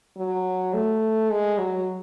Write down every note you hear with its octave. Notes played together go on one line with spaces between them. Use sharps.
F#3
A3
G#3
F#3